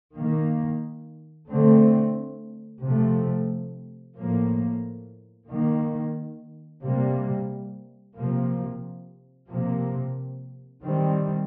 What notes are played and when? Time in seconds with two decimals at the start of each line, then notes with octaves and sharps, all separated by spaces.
0.17 D#3 A#3
1.50 D3 A3 C4
2.84 C3 F3 A3
4.17 A2 F3 A#3
5.50 D#3 A#3
6.83 C3 G3 A#3
8.16 C3 F3 A#3
9.50 C3 F3 A#3
10.83 D#3 G3 C4